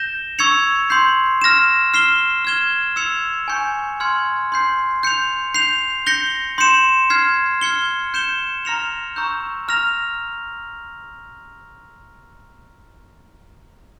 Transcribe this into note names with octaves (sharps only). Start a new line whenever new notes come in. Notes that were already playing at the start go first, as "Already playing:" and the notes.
Already playing: G6 A#6 E7 G7
C#6 E6 G#6 C#7 F7
C6 G6 C7
F6 A#6 E7
F6 C7 E7 G7
F6 G#6 E7 G7
E6 G#6 C#7 F7
G#5 C#6 G6 C#7
G#5 C6 F6 G#6 C#7
C6 G6 C7
G6 C#7 F7
G6 C7 F7
G6 A#6 C#7 G7
C6 G6 C#7 E7
F6 G#6 C7
F6 G#6 C#7 G7
G6 C#7 E7 G7
A#5 F6 A#6 C#7 F7
A#5 C#6 E6 G6
A#5 F6 A#6 F7